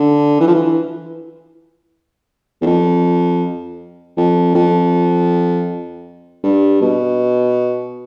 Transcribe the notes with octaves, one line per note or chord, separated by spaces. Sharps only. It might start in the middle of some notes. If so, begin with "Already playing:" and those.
Already playing: D3
E3
F3
E3
E2
F2
F2
F2
G2
B2